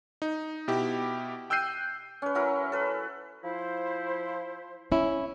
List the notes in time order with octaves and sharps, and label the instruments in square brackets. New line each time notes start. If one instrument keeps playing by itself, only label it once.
[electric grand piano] D#4
B2 E4 G4
G5 E6 F#6 G6 C7 D#7
[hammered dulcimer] C#4 B4
F#3 E4 A#4
A4 B4
[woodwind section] F3 E4 C5
[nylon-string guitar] C#4 E4